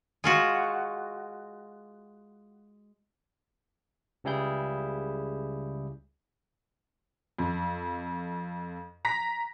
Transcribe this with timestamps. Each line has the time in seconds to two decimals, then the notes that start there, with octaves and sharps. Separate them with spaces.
0.24 G#3 F4 F#4
4.24 C#2 C#3 G3 E4 G#4 G6
7.39 F2
9.05 A#5 A#6 B6